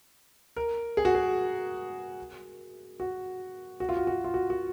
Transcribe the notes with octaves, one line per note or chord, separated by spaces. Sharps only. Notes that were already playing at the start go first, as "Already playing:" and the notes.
A#4
G#4
F#4
G#4
F#4
F#4
F4
F#4
F#4
F4
F#4
F#4